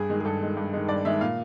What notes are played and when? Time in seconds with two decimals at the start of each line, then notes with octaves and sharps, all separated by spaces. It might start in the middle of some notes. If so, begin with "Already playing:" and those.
Already playing: G2 G#4
0.09 D#3 G#3
0.20 G#4
0.25 G2 A4
0.41 D#3 G#3
0.57 G2
0.73 D#3 G#3
0.88 G2 D5
1.05 D#3 G#3 E5
1.21 A#2 F5